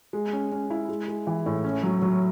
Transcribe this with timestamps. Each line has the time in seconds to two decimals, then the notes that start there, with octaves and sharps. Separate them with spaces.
0.13 G#3
0.33 C#4
0.52 C#4
0.70 E4
0.88 G#3
1.08 G#3
1.27 E3
1.46 A2
1.64 C#4
1.83 F#3
2.02 F#3